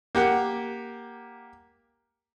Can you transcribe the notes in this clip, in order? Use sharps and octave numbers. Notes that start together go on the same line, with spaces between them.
A#3 G4 F#5